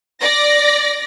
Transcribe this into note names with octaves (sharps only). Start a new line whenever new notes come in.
D5 A#6